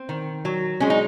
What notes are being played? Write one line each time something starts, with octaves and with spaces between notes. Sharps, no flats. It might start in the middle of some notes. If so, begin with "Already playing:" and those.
Already playing: C4
D#3
F#3
G#3 C#4
D#4